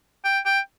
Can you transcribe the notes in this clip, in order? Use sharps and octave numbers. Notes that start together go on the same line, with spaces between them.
G5
G5